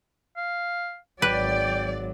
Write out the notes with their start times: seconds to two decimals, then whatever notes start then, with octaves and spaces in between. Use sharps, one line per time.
0.36 F5
1.22 G#1 F#3 B4 D5 G5